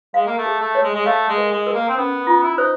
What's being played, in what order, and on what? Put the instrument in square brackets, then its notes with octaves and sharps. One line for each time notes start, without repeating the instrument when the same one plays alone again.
[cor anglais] G#3 [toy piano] F5
[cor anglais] A#3
A3
[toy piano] G#4
[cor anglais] A3
[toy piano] C#5
[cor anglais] G#3
G#3
[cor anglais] A3 [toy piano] F5
[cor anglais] G#3
[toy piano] A#4
[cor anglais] G#3
[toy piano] A#4
[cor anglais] A#3
C4
[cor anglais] B3 [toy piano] C#4
[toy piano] F4
[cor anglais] E4
[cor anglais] D#4 [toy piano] C5